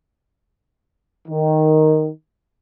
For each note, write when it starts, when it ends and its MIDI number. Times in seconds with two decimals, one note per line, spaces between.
1.28 2.08 51